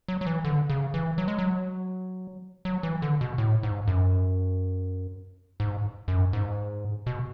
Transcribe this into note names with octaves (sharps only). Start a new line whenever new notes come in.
F#3
F#3
E3
D3
C#3
E3
F#3
G#3
F#3
F#3
E3
D3
B2
A2
G#2
F#2
G#2
F#2
G#2
B2